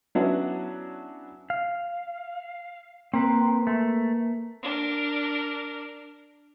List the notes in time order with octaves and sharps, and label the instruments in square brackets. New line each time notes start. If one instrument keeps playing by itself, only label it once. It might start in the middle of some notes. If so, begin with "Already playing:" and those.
[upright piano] F#3 B3 C#4 D4 E4 F#4
[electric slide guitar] F5
[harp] A#3 B4 [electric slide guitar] C4
[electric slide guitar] A3
[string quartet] D4 A#4